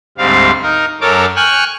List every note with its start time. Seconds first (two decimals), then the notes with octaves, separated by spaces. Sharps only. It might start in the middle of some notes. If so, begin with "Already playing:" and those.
0.18 D2 G#2 G3 C4 F5
0.62 D#4 A#4
1.01 F#2 A4 A#4 C#5 D6
1.36 G5 G#5 C#6 F6 F#6